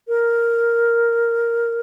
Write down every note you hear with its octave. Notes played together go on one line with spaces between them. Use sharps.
A#4